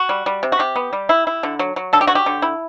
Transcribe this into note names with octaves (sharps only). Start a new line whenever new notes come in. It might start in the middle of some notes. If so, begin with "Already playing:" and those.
Already playing: F#4
G3
G3
C3
F#4
C3 G4
B3
G3
E4
E4
D3
F#3
F#3
D3 A4
G4
F#3 F#4
G4
D3
E4